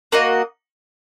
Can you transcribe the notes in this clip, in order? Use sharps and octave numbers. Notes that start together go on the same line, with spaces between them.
A#3 F#4 D#5